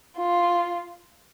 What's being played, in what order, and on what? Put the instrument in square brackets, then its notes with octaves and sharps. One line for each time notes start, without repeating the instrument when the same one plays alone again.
[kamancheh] F4